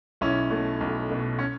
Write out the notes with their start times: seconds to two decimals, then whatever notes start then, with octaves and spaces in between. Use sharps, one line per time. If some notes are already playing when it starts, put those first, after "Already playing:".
0.21 B1 C#4 E4
0.50 B2 A3
0.81 B1
1.09 B2 A3
1.39 C#4